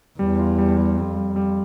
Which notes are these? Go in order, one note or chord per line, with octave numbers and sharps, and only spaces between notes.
E2 G3
F4
G3
G3
F2 G3
G3
G3